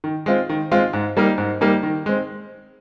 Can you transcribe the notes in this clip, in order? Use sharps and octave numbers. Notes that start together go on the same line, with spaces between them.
D#3
G#3 C4 F4
D#3
G#3 C4 F4
G#2
G3 A#3 D#4
G#2
G3 A#3 D#4
D#3
G#3 C4